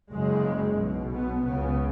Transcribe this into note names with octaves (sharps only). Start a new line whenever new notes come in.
F#1 F#2 C#3 G#3
B1 B2
B3
C#2 C#3 B3